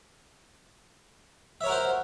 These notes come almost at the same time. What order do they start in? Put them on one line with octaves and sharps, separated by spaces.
E5 C#5 A#4 F#4 C5